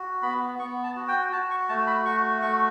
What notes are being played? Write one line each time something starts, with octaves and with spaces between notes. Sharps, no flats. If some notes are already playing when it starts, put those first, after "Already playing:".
Already playing: F#4
B3 B5
B3 C#6
A5
F#4
G5
F#4 A5
C#6
A3 A5
B5
F#4 C#6
A3 C#6